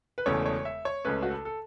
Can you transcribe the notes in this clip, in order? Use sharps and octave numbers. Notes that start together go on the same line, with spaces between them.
B4
E1 E2 C#3 A3 C#5
C#5
E5
C#5
C#2 C#3 A3 C#4 B4
F#4
A4
A4